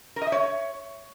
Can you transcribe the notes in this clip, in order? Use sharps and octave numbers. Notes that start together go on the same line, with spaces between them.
A#4
D#5
E5
C#5